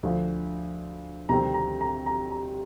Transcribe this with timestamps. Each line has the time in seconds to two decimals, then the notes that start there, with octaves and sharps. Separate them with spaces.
0.03 D2 D3 F3
1.29 D2 C3 D#3 G3 C4 A#5
1.54 A#5
1.81 A#5
2.06 A#5
2.31 A#5